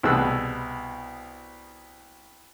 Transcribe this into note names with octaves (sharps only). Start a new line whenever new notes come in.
C2 B2 G#4 E6 F#6